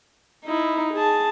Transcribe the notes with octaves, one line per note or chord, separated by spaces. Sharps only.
D#4 E4
G#4 A5